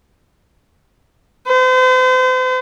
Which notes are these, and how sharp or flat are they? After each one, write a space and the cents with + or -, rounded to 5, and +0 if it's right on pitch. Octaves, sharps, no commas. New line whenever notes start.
C5 -40